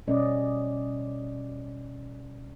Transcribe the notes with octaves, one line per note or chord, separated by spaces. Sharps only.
B2 G3 C#4 D5 D#5